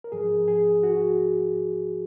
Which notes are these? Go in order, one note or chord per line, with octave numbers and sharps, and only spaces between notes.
A#4
G#2 F3 G#4
G#4
F#4